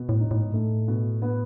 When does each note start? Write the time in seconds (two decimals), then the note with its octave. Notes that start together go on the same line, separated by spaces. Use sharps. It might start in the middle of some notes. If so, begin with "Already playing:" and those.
Already playing: B2
0.09 A2
0.20 D#4
0.31 A2
0.41 G#2
0.52 A2 A3
0.88 B2
1.22 B3